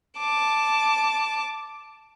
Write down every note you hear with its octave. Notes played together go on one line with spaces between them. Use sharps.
A5 D6